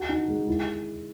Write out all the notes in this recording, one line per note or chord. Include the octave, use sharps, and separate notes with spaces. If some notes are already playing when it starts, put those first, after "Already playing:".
Already playing: F#4
D#4
G#3
E4